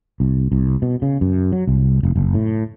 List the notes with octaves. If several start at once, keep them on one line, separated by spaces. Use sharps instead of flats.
C2
C2
B2
C#3
F#2
F#3
C2
F1
F#1
A2